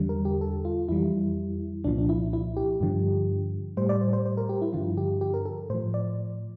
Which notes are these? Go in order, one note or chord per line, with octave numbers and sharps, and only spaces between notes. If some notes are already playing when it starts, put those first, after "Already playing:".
Already playing: E2 D3 G3
A#4
G4
A4
F4
F2 E3 G3 E4
C2 A#2 F3 D4
D4
E4
E4
G4
G2 D3 F3
A2 G3 C5
D5
C5
C5
C5
A#4
G4
E4
G2 D3 F3 F4
G4
G4
A#4
A4
A2 F3 C5
D5